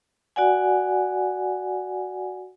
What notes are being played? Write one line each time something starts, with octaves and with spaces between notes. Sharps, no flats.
F#4 D5 F#5 G#5